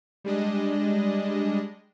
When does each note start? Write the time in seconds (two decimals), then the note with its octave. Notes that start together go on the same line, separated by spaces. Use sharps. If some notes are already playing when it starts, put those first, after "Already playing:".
0.24 G3 G#3 D4 D#5